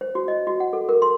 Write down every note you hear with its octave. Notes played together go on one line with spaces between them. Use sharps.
C5
F#4
D#5
F#4
F#5
A4
A#4
C6